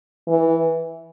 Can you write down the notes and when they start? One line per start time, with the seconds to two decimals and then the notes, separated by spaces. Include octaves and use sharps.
0.28 E3